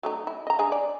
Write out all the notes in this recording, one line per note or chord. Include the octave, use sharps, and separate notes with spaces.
F#3 A3 D#4
E4
D#5 A#5
G#3 D4 G#4
D5